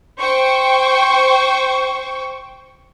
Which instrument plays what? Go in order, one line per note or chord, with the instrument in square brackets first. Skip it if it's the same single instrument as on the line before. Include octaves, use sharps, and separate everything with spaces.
[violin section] C5 G5 C#6